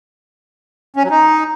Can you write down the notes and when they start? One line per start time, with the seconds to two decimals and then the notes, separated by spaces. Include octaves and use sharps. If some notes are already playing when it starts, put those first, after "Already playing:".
0.96 C#4
1.03 F#3
1.11 D#4